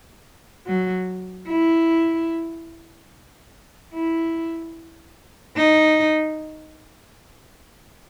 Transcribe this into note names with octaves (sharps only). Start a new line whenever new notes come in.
F#3
E4
E4
D#4